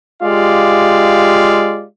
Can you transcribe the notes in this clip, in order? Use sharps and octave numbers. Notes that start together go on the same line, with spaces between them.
G#3 F4 G4 D5 F5